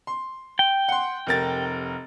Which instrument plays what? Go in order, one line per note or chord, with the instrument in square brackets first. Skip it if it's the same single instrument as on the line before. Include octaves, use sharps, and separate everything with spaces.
[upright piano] C6
[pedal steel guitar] G5
[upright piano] F#5 C6
F1 A#4 A6